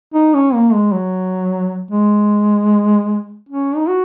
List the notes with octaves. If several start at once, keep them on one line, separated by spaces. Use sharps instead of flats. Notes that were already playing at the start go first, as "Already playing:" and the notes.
D#4
C#4
A#3
G#3
F#3
G#3
C#4
D#4
F#4